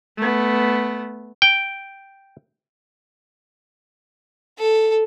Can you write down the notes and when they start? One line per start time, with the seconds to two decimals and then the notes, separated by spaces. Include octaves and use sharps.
0.17 A3 B3
1.42 G5
4.59 A4